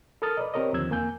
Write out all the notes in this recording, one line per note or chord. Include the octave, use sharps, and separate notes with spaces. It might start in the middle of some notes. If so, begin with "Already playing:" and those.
A4 A#4 A#5 D#6 F6 A6
B4 D5 D#5
C4 G4 A#4 C#5 D#5
D#2 D3 F3 C4 E6 G#6
E2 A#3 G#5 G6